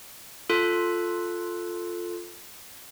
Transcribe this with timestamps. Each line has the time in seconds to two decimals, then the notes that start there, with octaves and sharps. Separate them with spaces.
0.50 F4 A4 F#6